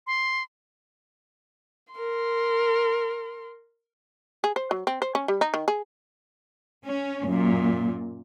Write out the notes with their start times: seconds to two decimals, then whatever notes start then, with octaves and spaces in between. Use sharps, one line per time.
0.07 C6
1.94 A#4 C6
4.44 G#4
4.56 C5
4.71 F#3
4.87 C4
5.02 C5
5.15 C#4
5.28 G3
5.41 D#4
5.54 D#3
5.68 G#4
6.85 C#4
7.26 F#2 A#2